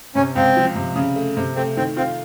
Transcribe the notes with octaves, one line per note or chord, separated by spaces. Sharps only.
C3 C#4
C#2 C4
F3
C3
C#3
A3
C3
A3 C4
D#3 C4
C4 F4